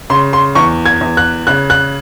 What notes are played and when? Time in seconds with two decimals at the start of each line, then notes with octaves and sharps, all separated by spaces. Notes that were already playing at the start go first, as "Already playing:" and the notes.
0.10 C#3 C6
0.33 C6
0.55 E2 C#6
0.86 G#6
1.01 E2
1.17 F#6
1.47 C#3 F#6
1.70 F#6